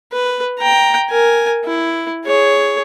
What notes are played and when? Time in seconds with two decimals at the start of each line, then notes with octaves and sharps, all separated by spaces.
0.13 B4
0.59 G5 A#5
1.10 A#4 G#5
1.64 E4
2.26 G#4 C#5